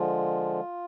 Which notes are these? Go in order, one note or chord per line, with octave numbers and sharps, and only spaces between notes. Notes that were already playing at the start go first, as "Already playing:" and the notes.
Already playing: D3 F3 G#3 F4